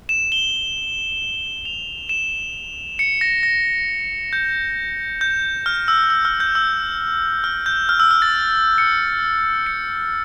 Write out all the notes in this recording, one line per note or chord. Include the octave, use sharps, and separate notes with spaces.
E7
G7
F7
E7
C#7
A#6
A#6
G6
G6
F6
E6
E6
F6
G6
E6
F6
G6
F6
E6
F6
A6
C#7
C#7